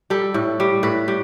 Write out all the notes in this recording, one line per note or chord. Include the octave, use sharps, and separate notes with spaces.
G3 A4
A2
G3
A2 B4
G3